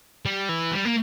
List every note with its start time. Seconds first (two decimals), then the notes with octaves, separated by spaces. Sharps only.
0.26 G3
0.49 E3
0.72 G3
0.85 A#3